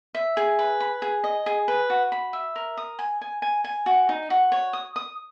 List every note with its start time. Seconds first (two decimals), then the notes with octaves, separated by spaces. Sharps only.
0.15 E5
0.37 G#4
0.59 B4
0.80 B5
1.02 G#4
1.24 D#5
1.46 G#4
1.68 B4
1.90 F#4
2.12 B5
2.33 E5
2.56 A#4
2.77 D#6
2.99 G#5
3.21 G#5
3.42 G#5
3.64 G#5
3.86 F#4
4.09 D#4
4.30 F#4
4.52 C#5
4.73 D#6
4.96 D#6